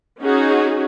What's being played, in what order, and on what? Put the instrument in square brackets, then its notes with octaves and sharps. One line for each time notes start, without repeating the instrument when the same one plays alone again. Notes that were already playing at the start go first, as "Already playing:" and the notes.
[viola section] C#4 D#4 F#4 G#4